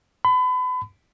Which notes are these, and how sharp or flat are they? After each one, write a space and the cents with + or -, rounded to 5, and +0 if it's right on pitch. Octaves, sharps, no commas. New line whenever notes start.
B5 +35